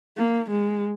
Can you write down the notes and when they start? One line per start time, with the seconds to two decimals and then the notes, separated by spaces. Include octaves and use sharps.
0.17 A#3
0.50 G#3